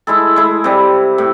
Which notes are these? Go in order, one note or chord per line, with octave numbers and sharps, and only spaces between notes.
G#3 E4 A4
G#3 E4
C3 G3
A2